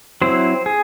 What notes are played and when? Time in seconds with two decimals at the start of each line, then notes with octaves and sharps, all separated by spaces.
0.22 F#3 C4 E4 C5
0.66 G#4